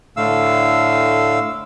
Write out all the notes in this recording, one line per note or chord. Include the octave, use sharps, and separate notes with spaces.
A2 D3 A3 F5 E6